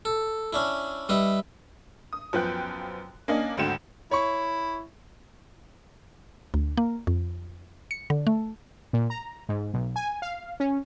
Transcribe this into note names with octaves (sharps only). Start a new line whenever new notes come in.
A4
C#4 D4 E4
G3 D#4 B4 E5
D#6
F#2 F3 B3 G5 F#6
A#3 C#4 D4 D#5
G#1 D2 D3 F#4 G5 E7
E4 C#5 C#6
D2
A#3
F2
C#7
D3
A3
A#2
A#5
G#2
B1
G#5
F5
C#4